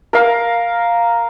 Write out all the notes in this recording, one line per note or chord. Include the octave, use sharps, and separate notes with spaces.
A#4 F5